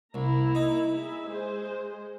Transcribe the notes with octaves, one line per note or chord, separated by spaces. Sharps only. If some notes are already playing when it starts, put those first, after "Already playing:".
C2 A#3 E4 A#5
D#4
E4 G#4 E5
G#3 G#4 C5